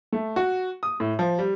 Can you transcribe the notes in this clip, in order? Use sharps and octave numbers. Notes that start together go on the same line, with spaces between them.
A3
F#4
D#6
A2
F3
G3